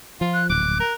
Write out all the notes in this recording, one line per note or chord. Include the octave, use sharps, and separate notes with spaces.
F3 F4
F#6
D1 A#1 D6 F#6
A#4